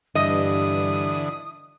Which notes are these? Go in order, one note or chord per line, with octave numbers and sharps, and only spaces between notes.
G2 D3 E3 D#5 D#6